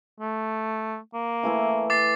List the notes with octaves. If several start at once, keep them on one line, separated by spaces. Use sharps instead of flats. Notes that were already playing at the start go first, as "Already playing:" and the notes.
A3
A#3
E3 A3 E4
D6 A6 C7